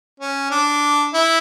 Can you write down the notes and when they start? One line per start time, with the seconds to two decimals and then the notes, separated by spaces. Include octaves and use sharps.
0.20 C#4
0.51 D4
1.14 E4